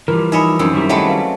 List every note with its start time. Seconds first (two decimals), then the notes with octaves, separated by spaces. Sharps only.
0.08 E3 F3 G3 A#4
0.32 D#4 C#5 D#5 E5 G#5 B5
0.59 F#2 C4 D#4 E6
0.73 D#3 G3 E4
0.89 F#3 G#3 A3 E5 G5 B5
1.08 B4 F5